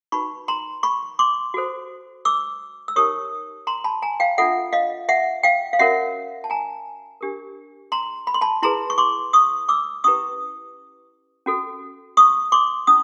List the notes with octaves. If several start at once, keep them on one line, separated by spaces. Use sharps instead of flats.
D#4 F#4 B4 B5 C#6
A#5 C6
B5 C#6
C6 D6
F#4 A4 C5
D6 E6
E6
D#4 G4 A#4 C#5 C#6 D#6
A#5 C6
A5 B5
G#5 A#5
F5 G5
D4 F4 A4 E5 F#5
D#5 F5
E5 F#5
F5 G5
F5
C#4 F#4 A#4 C#5 E5 F#5
A5
G#5 A#5
D4 G4 A#4
A#5 C6
B5
C6
A5 B5
E4 G#4 B4 A#5 C6
C#6
C6 D6
C#6 D#6
D6 E6
C#4 E4 G4 B4 C#6 D#6
C#4 F#4 A4
C#6 D#6
C6 D6
C#4 E4 D#6